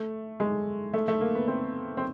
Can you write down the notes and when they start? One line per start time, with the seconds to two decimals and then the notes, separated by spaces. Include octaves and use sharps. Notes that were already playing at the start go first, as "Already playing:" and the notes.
Already playing: A3
0.40 G#3
0.93 A3
1.08 A3
1.21 A#3
1.35 B3
1.48 C4
1.97 C4